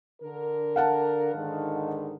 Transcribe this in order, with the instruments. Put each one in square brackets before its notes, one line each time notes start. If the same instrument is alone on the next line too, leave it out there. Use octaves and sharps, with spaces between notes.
[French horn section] D3 A#4
[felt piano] F5 F#5 A5
[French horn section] G#2 D3 D#3